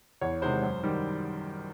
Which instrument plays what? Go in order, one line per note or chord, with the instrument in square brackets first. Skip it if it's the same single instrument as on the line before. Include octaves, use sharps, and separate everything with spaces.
[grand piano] E2 C#5
C3 D#3 G#3 C5
F#2
D#3 G3